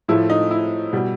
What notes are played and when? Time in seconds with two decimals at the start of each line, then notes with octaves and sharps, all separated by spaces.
0.08 A2 F3 A3 E4
0.30 D#4
0.51 E4
0.93 B2 G3